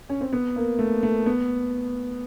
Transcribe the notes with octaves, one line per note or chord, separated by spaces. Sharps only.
C#4
C4
B3
A#3
A3
A3
B3